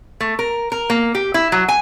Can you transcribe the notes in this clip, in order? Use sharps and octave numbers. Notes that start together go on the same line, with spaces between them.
A3
A#4
A#4
A#3
G4
E4
F#3
G#5